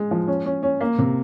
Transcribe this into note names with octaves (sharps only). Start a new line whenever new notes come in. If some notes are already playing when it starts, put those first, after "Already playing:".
Already playing: G#3
F3
C#4
C#4
C#4
A#3
C3